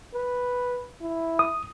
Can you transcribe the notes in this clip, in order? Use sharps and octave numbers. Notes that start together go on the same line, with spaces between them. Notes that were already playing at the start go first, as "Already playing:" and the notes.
B4
E4
D#6